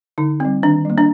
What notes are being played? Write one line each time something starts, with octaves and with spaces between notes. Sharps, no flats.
D3 D#4
G3 C4
D#3 D4
G3 A#3
D4